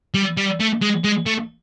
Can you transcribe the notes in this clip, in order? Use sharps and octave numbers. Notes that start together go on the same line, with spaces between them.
G3
G3
A3
G#3
G#3
A3